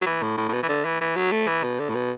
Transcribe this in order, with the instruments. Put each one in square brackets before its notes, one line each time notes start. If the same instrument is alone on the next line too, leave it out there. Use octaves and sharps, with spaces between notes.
[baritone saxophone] F#3
E3
A2
A2
A2
B2
E3
D3
E3
E3
F#3
A3
E3
B2
D3
A2
B2